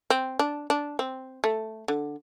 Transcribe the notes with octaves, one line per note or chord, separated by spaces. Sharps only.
C4
D4
D4
C4
A3
D3